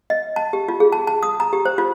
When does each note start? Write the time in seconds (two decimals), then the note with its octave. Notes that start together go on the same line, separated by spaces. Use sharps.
0.10 D#5
0.36 A5
0.53 G4
0.68 F4
0.80 G#4
0.92 A5
1.07 A5
1.23 D#6
1.40 A#5
1.53 G4
1.65 C5
1.78 F4